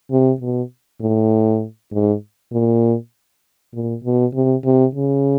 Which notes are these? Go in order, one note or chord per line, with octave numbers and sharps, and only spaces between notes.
C3
B2
A2
G#2
A#2
A#2
B2
C3
C3
C#3